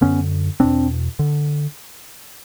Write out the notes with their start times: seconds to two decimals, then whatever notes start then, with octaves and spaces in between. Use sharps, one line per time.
0.01 F#2 D3 B3 C#4
0.60 E2 B2 C4 D4
1.19 D3